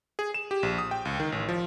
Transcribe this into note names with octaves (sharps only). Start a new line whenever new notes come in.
G#4
E7
G4
A#1
D#6
G5
C#2
D#3
A1
F3